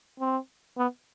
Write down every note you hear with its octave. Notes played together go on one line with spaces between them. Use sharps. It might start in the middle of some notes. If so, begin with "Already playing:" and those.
C4
B3